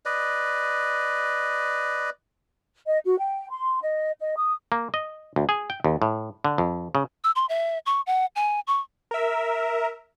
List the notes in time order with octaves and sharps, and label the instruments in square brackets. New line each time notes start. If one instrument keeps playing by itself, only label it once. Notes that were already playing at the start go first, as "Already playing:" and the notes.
[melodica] B4 D5 D#5
[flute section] D#5
F#4
G5
C6
D#5
D#5
D#6
[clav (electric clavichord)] A#3
D#5
D2
G#4
G5
D#2
A2
D3
F2
C#3
[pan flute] E6
C6
E5
C#6
F#5
G#5
C#6
[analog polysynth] A#4 E5